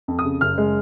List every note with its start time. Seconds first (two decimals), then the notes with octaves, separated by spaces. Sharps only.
0.08 F2
0.19 D#6
0.24 C#3
0.41 F#1 F6
0.58 G#3